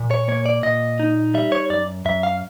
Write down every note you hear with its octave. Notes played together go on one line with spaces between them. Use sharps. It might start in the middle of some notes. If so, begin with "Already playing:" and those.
Already playing: A#2
C#5
A#3 C#5
D5
A#2 D#5
D#4
G3 E5
C#5
F#2 D5
F#2 E5
F5